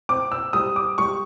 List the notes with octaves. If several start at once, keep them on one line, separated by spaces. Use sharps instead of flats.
C4 D6
E6
G3 D#6
D6
G3 C#6